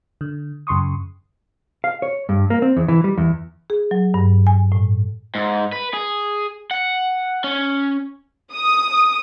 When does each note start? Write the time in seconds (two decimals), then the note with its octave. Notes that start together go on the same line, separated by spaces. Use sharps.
0.21 D3
0.67 F#2 C#3 C6 C#6 D#6
1.84 F5
2.02 C#5
2.29 G2
2.50 A#3
2.62 C4
2.77 E2
2.88 E3
3.04 G3
3.18 E2
3.70 G#4
3.91 F#3
4.14 G2
4.47 G#5
4.72 A2
5.35 G#2
5.72 B4
5.94 G#4
6.71 F#5
7.44 C#4
8.53 D#6